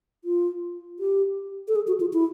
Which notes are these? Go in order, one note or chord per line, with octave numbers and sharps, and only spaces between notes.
F4
G4
A4
G#4
F#4
F4
E4